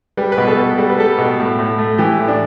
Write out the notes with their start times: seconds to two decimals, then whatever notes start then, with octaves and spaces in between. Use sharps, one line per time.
0.17 G3 B4
0.32 B4
0.38 B2
0.47 A4
0.57 B2
0.78 G3 A4
0.89 B4
0.97 G3 A4
1.18 B2
1.39 A2
1.59 A2
1.79 A3
1.98 E3 G4
2.19 A2
2.28 D4